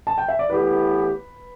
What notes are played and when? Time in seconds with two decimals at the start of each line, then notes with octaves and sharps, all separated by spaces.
0.07 A5
0.18 G5
0.28 E5
0.39 D5
0.50 A2 E3 B3 G4 B4